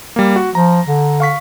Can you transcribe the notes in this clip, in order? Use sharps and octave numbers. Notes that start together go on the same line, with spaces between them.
G3 A#3
F#4
F3 A#5
D3
F5 C#6 B6